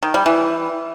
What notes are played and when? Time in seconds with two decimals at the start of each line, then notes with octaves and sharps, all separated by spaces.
0.03 D#3
0.14 G3
0.26 E3